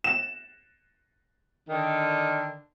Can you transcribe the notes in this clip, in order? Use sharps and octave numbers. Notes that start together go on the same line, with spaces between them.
E7
D3 D#3